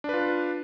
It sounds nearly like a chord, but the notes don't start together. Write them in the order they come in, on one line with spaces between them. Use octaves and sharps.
D4 B4 F4